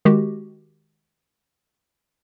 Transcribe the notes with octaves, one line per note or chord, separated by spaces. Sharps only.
D#3 G#3 F#4 G4